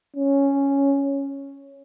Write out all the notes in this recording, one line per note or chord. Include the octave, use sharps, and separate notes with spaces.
C#4